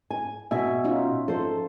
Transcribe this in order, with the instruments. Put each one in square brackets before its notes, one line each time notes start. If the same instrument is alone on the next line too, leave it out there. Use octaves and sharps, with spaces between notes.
[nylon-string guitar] G#5
[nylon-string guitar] B2 G#5 [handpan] E5
[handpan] C#4 D#4 F4
[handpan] F3 [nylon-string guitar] A4 C5